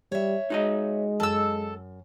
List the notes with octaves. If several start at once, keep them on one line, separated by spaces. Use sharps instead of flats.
G3 C#5 E5
G#3 D#4 F#4 D#5
F#2 A4 E6